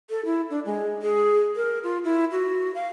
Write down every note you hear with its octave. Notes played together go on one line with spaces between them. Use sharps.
A4
E4
D4
G#3
G#4
A#4
F4
E4
F#4
F5